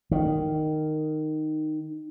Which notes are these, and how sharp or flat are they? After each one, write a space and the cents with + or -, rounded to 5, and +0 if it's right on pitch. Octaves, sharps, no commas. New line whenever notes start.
D#3 -10